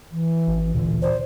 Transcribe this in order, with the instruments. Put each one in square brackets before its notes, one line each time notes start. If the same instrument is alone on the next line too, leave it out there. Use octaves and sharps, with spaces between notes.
[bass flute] E3
[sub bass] G#1
[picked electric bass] D1 D3 E3 [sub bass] A#2
[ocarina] C5 [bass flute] D5